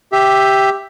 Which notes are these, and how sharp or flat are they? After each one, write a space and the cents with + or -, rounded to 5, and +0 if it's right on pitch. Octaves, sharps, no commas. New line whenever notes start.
G4 +0 E5 +0